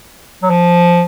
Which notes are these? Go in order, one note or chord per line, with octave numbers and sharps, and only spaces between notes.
F#3
F3